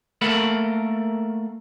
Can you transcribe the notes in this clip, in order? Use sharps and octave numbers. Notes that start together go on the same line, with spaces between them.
A3 A#3 A4 A#4 F#5 B5